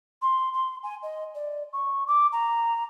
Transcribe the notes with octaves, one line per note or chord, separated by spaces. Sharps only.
C6
C6
G#5
D#5
D5
C#6
D6
A#5